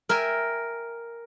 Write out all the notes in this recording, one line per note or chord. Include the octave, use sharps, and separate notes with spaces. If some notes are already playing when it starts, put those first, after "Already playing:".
A#4 E5 G5 G#5